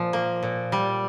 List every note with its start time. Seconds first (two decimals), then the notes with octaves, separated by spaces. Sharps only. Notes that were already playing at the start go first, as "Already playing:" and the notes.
Already playing: A#2 F3
0.13 A#3
0.43 A#2
0.72 G3